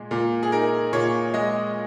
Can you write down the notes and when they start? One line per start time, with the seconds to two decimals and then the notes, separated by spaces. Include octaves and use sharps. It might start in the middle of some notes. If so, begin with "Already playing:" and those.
Already playing: A#2 G#3
0.11 A#2
0.43 G#4
0.52 D#4 A#4
0.93 A#2 C#5
1.34 G#3 D#5